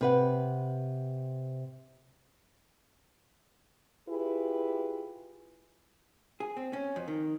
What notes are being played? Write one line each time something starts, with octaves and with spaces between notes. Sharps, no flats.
C3 B4 F#5
E4 F4 G4 G#4 B4
G#4
C4
C#4
F2
D#3